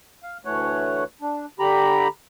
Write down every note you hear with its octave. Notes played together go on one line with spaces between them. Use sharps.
F5
D2 E3 A3 C#5 F#5
D4
D3 G4 A#5 B5